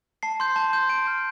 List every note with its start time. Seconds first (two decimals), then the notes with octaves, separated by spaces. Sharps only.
0.23 A5 C7
0.40 C6 G6
0.56 A5
0.73 C6 G6
0.89 A5 D7
1.07 C6 F6